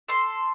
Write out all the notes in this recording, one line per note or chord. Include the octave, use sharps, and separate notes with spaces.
A4 C6